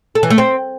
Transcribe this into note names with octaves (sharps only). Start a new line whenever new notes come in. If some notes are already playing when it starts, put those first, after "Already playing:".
A4
E3
A3
C4